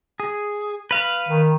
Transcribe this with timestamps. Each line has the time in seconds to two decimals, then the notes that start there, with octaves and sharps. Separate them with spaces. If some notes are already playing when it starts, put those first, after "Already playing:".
0.20 G#4
0.91 B4 F5
1.29 D#3